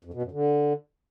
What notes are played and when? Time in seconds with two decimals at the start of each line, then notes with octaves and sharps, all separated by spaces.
0.05 F2
0.14 B2
0.23 F#2
0.32 D3